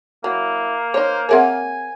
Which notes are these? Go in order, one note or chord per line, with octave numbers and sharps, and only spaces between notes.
F#3 A#3 E4
D#4 C5 C#5
C4 G#4 A#4 C#5 E5 F#5 G#5